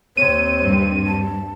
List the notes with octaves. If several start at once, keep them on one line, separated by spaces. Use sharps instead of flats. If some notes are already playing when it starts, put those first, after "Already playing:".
D#2 C4 C#5 D#7
G2
A5